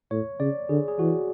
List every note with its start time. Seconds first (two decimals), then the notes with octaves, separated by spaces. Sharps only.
0.11 A2 C#5
0.40 C#3 D5
0.69 D3 G#4
0.88 G#4
0.99 E3 F#4